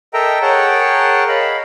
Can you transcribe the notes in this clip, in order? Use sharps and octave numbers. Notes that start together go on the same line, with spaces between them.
A4 A#4 D#5 E5 G5 A#5
G#4 A#4 C#5 F#5 G5 A5
D#5 F5 B5